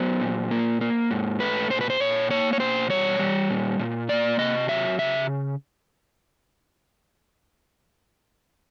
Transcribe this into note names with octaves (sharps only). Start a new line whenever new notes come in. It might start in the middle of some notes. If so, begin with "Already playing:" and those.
Already playing: F#3 B3 C5
A#2
A#3
A#3
G#2
A3 B4
A#2 C5
B4
C5
A#2 C#5
A#3 C#5
C#5
B2 C5
G3 C#5
G3
A#2
A#2
A#3 D5
C3 D#5
F#3 E5
C#3 E5